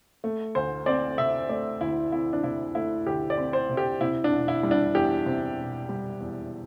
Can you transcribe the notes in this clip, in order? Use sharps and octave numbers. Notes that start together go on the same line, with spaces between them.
A3
D2 C5
C4 D5
C3 E5
A3 D5
D2 E4
C4 E4
D4
C3 E4
A3 E4
D2 G4
D5
C4
C5
C3
G4
C3 E4
D4
E1
E4
G3
D4
E2 G4
C3
E1
G3
E2